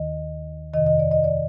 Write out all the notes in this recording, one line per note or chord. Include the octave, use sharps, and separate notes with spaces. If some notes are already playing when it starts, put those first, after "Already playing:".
Already playing: D#2 D#3 D#5
F2 C3 D#3 D#5
D#5
D5
D#5
D5